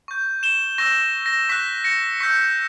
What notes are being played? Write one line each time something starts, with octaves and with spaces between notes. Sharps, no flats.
C#6 G6
E7 G7
C#6 E6 G6 A#6
A#6
C#6 F#6 B6
A#6 C#7
C#6 E6 G6 B6